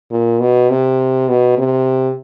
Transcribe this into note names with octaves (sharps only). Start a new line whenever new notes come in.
A#2
B2
C3
B2
C3